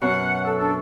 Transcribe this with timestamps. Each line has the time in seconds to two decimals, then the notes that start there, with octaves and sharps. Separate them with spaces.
0.02 F#2 B2 F#5
0.45 A4
0.58 D4 A4